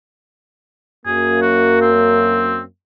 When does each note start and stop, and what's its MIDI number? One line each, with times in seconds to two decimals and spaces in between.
1.06 2.64 42
1.06 2.64 58
1.06 1.41 68
1.42 1.77 66
1.81 2.60 60